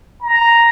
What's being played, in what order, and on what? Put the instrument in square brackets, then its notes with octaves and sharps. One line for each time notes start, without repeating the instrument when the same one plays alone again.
[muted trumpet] A#5